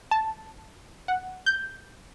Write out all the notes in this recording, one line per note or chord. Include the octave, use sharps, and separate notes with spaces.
A5
F#5
G6